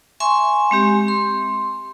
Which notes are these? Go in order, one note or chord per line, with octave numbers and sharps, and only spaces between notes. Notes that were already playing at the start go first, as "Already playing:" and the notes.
E5 G#5 C6 C#6
G#3 C4 G4
C6